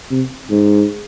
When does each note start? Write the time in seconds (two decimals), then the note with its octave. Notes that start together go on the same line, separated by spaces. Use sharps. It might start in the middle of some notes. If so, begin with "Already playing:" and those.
0.11 C3
0.50 G#2